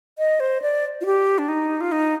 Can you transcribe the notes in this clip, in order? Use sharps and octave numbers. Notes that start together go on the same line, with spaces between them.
D#5
C5
D5
F4
G4
D4
D#4
F4
D#4